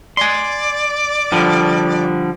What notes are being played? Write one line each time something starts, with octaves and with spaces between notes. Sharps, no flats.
D5 G#5 C6
D3 F3 G3